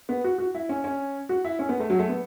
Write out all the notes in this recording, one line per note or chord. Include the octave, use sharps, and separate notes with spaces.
B3
F#4
F#4
E4
C#4
C#4
F#4
E4
C#4
B3
A3
F#3
A3
B3